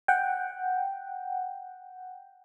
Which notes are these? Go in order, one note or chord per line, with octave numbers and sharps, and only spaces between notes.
F#5 G5